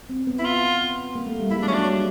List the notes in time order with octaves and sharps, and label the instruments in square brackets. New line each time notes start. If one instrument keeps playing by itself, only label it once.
[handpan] C4
B3
[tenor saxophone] E4
F4
[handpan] A#3
A3
G3
[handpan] G#3 [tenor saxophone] E4
[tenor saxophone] D4
[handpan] F#3 [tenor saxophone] C#4
[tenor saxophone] D4
[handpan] G3